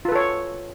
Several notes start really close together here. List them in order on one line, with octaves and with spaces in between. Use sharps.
F4 B4 A4 C#5